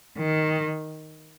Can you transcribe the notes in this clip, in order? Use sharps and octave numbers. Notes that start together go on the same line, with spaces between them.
D#3